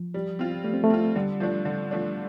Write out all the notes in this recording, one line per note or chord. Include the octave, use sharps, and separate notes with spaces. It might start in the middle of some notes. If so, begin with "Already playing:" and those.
Already playing: F3
G3
C4 F4
G3 A3
C4
A3
C4 F4
D3 G3
F3 A3 D4
D3
F3 A3 D4